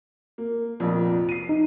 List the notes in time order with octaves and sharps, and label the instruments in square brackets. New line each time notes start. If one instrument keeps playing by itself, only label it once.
[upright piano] A#3
F1 F2 A#2
C7 D#7
[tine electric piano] D#4